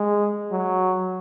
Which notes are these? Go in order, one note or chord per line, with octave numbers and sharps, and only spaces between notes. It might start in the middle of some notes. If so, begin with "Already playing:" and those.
Already playing: G#3
F#3